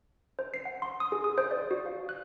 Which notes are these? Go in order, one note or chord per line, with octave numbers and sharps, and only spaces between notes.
C5
C7
F#5
C6
D#6
G#4
D#6
C5
D5
F#4
F5
F#6